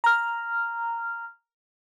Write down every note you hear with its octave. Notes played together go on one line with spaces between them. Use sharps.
A#5 F6